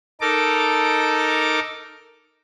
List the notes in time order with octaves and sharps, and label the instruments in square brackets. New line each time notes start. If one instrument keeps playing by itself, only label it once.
[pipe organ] D#4 A4 A#4 D6